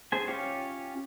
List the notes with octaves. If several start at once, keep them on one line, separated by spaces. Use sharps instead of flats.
G#4 C5 G#5
C#4 F4 G4 C#5